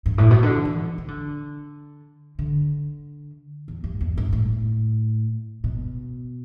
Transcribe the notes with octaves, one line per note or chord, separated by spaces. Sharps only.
G2
A2
B2
D3
E3
E3
D3
D3
E2
G2
E2
G2
A2
B2